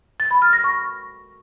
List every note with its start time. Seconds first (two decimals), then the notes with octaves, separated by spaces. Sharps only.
0.20 A6
0.31 B5
0.42 F6
0.53 A#6
0.64 C#6